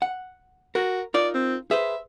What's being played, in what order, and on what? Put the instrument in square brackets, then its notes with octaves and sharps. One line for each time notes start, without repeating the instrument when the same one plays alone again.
[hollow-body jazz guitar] F#5
[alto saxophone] F#4 [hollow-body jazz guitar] A#4
[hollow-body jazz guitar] D#4 F4 A#4 [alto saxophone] D5
[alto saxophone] C4
[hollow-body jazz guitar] G#4 B4 C5 [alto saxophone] E5